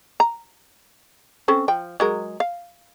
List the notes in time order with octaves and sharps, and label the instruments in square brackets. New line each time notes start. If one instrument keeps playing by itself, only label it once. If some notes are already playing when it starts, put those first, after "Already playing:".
[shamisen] A#5
C4 C#4 A4
F3 G5
F#3 G#3 A#4
F5